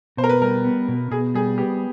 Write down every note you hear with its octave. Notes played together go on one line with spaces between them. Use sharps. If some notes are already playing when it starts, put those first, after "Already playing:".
B2 C5
A#4
B4
G3 A#4
B3
B2
B2 G#4
G3 G#4
B3 G4